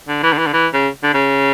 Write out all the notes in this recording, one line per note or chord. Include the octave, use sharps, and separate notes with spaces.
D3
E3
D3
E3
D3
E3
C#3
D3
C#3